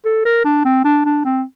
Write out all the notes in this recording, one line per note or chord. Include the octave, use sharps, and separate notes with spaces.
A4
A#4
D4
C4
D4
D4
C4